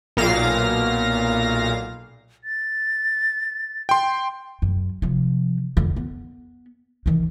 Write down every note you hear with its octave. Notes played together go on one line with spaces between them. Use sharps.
B1 A#2 F5 A#6
A6
G5 C6
F#2
C3 F3
F2 D3
B3
D#3 E3